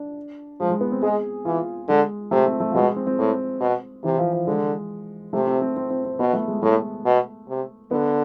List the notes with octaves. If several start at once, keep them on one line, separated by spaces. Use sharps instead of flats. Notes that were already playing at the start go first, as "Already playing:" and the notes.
Already playing: D4
F3 G#3
G#3
B3
C4
G#3 G#4
E3 F4
D3 G#3
C3 A3
C4
A3
F3
B2 G#3
C4
C4
A2
B2
C3 E3
F3
F3
D3 G#3
C3 A3
C4
C4
C4
C4
C4
B2 B3
A3
G#3
A2 A3
B2
C3
D3 B3